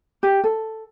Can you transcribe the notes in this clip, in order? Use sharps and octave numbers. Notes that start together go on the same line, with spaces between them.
G4
A4